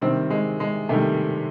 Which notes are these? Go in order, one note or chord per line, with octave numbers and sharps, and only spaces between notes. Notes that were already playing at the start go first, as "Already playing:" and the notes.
C3 D#3 G3 C4
G#3
G#3
C3 D#3 G3 A3